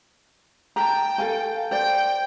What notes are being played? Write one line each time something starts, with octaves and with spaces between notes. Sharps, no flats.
G5 A5 A#5
A4 F5 G#5
C5 D5 G5